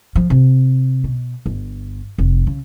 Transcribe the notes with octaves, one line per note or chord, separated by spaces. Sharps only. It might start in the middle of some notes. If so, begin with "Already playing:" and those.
F3
C3
B2
G1
F1
C#3